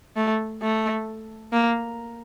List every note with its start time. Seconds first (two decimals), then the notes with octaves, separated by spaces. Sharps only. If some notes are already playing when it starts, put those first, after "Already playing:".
0.16 A3
0.62 A3
1.53 A#3